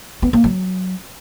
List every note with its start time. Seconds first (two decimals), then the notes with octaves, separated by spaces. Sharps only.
0.22 B3
0.33 A#3
0.44 F#3